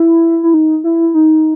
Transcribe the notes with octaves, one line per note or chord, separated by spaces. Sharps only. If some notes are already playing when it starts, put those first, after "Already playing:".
Already playing: E4
E4
D#4
E4
D#4